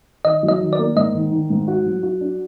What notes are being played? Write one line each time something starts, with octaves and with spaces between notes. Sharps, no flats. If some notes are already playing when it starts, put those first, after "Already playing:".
D#3 D#5
F#3
D#5
D#3
D5
A#3
G#2 D#5
D#3
D#3
G#2
F#4
F#3
F#4
D4